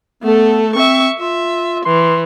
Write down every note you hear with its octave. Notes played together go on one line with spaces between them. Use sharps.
A3 B3 A4
C4 E5 C#6
F4 E5
E3 C6